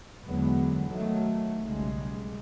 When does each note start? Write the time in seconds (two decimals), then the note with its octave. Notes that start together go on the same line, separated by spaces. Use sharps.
0.25 E2 D3 F#3 G#3 B3
0.88 D#3 F#3 A3
1.60 B1 C#3 G3 G#3